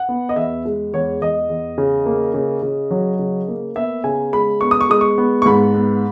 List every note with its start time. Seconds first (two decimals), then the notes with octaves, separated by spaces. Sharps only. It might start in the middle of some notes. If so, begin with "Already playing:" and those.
Already playing: F#5
0.09 B3
0.29 D#5
0.36 E2 E5
0.65 G#3
0.93 E2 C#5
1.21 E2 D#5
1.49 E2
1.78 C#3
2.06 A#3
2.34 C#3
2.63 C#3
2.91 F#3
3.19 C#3
3.48 A#3
3.76 B3 E5
4.04 C#3 G#5
4.33 G#3 B5
4.61 B3 C#6
4.71 D#6
4.81 C#6
4.90 G#3 D#6
5.01 C#6
5.18 B3
5.42 C#6
5.46 G#2 B5
5.74 B3